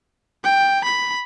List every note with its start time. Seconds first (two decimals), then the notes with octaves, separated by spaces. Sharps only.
0.44 G5
0.84 B5